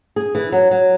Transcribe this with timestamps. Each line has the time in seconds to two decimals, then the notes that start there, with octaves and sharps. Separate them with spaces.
0.16 G#4
0.35 E3
0.52 F#3
0.71 F#3